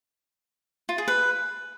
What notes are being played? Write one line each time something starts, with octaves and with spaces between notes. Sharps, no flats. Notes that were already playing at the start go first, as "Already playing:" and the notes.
F4
G#4
B4